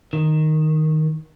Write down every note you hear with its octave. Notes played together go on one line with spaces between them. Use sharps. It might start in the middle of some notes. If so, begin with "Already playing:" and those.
D#3